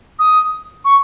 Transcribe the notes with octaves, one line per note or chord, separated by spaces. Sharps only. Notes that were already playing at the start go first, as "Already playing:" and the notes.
D#6
C#6